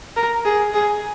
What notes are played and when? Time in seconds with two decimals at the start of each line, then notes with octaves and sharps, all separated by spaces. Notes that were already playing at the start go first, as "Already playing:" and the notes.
0.16 A#4
0.45 G#4
0.74 G#4